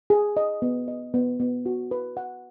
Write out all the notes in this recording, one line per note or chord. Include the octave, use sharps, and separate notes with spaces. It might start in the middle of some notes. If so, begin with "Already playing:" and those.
G#4
D#5
B3
D#5
B3
B3
F#4
B4
F#5